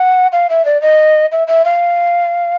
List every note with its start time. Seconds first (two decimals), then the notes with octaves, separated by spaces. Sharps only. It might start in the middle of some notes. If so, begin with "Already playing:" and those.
Already playing: F#5
0.32 F5
0.50 E5
0.65 D5
0.82 D#5
1.32 E5
1.48 E5
1.65 F5